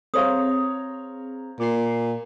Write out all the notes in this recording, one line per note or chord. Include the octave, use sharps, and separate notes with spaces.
C4 G#4 C5 C#5 F5 A#5 D#6
A#2 D6 C7